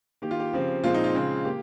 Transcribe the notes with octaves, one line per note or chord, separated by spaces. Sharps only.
D#3 A#3 G4
F4
G4
C#3 F3 C4
A#2 F3 G#3 C4 F4
D#4
F4
C#3 G#3 C4
A#3 G4